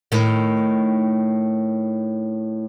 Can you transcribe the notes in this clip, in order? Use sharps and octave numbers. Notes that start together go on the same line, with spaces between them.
A2 D#3